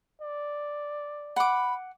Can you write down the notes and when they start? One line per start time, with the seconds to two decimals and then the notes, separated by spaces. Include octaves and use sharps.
0.21 D5
1.36 F#5 B5 D6